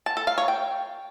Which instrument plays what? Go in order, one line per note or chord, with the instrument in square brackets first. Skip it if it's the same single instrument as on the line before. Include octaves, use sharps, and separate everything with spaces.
[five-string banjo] A5
A4
F5
C#5
G5